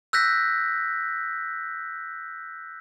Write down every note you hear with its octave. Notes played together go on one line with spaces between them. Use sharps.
E6 F#6 G6 A#6 B6